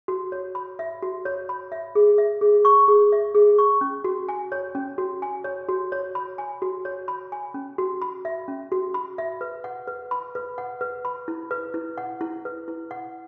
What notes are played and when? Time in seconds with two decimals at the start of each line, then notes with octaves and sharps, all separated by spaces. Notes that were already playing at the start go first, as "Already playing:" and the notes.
0.08 F#4
0.32 C#5
0.55 B5
0.79 E5
1.02 F#4
1.25 C#5
1.49 B5
1.72 E5
1.95 G#4
2.18 E5
2.41 G#4
2.65 C#6
2.88 G#4
3.12 E5
3.35 G#4
3.58 C#6
3.81 C#4
4.04 F#4
4.29 G#5
4.52 C#5
4.75 C#4
4.98 F#4
5.22 G#5
5.44 C#5
5.69 F#4
5.92 C#5
6.15 B5
6.38 G#5
6.62 F#4
6.85 C#5
7.08 B5
7.32 G#5
7.54 C#4
7.78 F#4
8.02 B5
8.25 E5
8.48 C#4
8.72 F#4
8.94 B5
9.18 E5
9.41 B4
9.64 F#5
9.88 B4
10.11 B5
10.35 B4
10.58 F#5
10.81 B4
11.05 B5
11.28 E4
11.51 B4
11.74 E4
11.98 F#5
12.21 E4
12.45 B4
12.68 E4
12.91 F#5